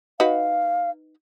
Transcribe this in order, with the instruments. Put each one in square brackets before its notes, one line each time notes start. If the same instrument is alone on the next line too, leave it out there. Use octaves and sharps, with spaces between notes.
[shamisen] D#4 F#4 B4 [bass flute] F5